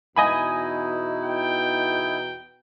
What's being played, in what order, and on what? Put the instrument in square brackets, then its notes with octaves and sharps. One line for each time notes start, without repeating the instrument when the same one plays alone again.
[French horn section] E2 B2 [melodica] D#4 E4 [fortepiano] D#5 G#5 B5
[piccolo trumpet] G5